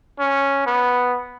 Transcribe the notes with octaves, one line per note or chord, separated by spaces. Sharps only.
C#4
B3